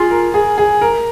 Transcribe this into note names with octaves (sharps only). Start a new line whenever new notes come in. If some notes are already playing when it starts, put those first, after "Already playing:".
Already playing: F4 G#4
A#4
G#4
G#4
A#4